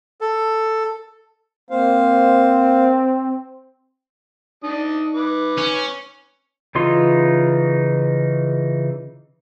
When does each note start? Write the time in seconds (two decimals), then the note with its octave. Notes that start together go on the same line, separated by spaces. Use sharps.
0.21 A4
1.70 A#3 C4 C5 F5
4.63 D4 D#4 D#6
5.15 B4 D6
5.58 C#4
6.75 C#3 E3 D#4 F4 C6